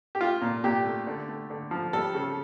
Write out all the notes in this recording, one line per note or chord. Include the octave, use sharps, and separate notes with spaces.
G4
A3 F4
A#2
A#2 G4
A3
D3
A3
D3
F3
G3 A4
C#3